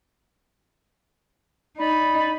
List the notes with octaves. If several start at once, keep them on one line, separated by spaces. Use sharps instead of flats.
D#4 D5 B5